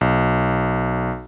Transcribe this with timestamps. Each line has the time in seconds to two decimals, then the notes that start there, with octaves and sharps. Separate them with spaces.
0.01 B1